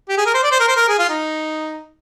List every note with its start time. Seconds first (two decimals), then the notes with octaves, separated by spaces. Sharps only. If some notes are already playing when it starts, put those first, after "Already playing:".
0.09 G4
0.18 G#4
0.26 A#4
0.34 C5
0.43 D5
0.51 C5
0.60 A#4
0.68 C5
0.76 A#4
0.88 G#4
0.99 F4
1.10 D#4